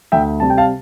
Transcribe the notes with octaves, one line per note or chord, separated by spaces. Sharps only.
D2 E5 G5
C3 G3 A5
G5
F5 A5